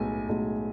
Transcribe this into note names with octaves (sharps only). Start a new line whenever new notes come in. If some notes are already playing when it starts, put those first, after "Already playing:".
Already playing: B1 A2 G#3 G#5
B1 A2 G#3